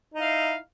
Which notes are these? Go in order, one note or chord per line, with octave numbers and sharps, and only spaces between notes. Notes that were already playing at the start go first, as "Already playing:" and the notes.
D#4 E4 F5